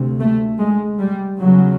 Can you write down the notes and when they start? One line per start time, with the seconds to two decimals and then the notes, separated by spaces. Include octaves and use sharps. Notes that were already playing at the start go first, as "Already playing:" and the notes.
Already playing: D2 C3
0.20 A3
0.60 G#3
1.00 G3
1.39 E2 C#3 F#3